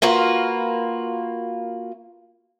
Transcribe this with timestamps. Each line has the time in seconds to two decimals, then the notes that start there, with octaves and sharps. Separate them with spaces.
0.02 A#3 F4 F#4 B4